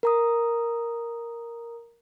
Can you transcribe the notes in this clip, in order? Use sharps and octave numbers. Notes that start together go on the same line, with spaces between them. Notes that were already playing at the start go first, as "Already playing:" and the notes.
A#4 A#5 D#6